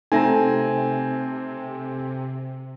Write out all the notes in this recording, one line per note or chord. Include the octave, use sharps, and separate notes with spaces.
C3 A3 C4 D#4 E5 G#5 A#5